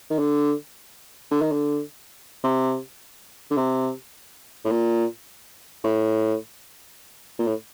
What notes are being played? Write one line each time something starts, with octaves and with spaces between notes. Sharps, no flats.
D#3
D3
D3
D#3
D3
C3
D3
C3
A2
A#2
A2
A#2
A2